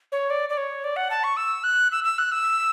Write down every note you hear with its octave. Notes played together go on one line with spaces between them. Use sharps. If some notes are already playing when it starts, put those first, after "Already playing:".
C#5
D5
D5
C#5
D5
F#5
A5
C#6
E6
F#6
E6
E6
F#6
E6